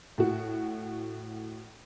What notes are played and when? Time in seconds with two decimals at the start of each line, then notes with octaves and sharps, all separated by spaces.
0.18 A2 F#4